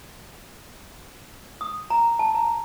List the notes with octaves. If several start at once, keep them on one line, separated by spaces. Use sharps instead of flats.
D#6
A#5
A5
A#5